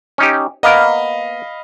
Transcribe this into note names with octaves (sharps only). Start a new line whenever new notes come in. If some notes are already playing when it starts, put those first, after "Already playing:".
C#4 D#4 G4
A#3 B3 A#4 D#5 F5 B5